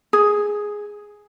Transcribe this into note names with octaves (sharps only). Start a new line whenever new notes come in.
G#4